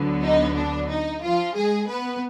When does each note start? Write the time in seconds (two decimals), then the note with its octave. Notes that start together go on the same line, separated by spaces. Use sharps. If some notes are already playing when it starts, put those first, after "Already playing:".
Already playing: D2 D3 F#3 B3
0.24 D#4
0.56 D4
0.89 D#4
1.23 F3 F4
1.56 G#3 G#4
1.88 B3 B4